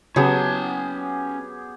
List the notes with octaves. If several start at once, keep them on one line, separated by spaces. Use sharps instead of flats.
C#3 F#3 B3 C#4 G4 G#4 A5